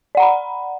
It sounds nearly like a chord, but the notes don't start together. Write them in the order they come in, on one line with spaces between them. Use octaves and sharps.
D5 F#5 A#5 B5